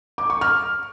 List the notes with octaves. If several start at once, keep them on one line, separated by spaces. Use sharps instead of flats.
D6
C#6
F6